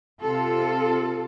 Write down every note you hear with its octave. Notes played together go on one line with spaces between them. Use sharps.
C3 F4 A4